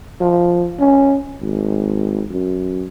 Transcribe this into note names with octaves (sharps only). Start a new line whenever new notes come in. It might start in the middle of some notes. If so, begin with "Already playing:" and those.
F3
C#4
G#1
F#2